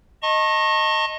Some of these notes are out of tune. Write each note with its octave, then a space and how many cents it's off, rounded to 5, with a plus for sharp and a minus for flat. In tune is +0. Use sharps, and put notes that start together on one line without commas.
D#5 +0 A5 +35 C#6 -35